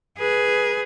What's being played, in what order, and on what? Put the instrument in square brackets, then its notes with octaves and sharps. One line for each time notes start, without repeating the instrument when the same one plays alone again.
[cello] G#4 [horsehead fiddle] B4